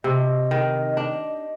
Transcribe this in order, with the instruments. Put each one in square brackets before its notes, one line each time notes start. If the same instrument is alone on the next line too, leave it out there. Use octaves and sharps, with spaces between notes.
[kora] C3 [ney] D#5
[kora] D#3
D4